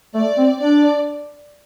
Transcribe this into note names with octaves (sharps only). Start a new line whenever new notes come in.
A3 D5
C4
D4 D5